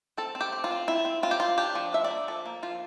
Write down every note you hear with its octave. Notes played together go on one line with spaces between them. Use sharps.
C4 A4
C4
G4
C4
F4
C4
C4 E4
C4
C4 F4
G4
C4 F4
D4 G4
F3
D4 E5
D5
A#3
F3 A4
A#3
F3 F4